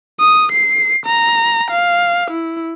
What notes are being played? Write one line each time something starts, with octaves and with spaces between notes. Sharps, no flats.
D#6
C7
A#5
F5
E4